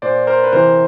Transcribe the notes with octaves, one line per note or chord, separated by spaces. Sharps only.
A#2 C5 D5
A#4 C5
B4
C3 E3 A#4 C5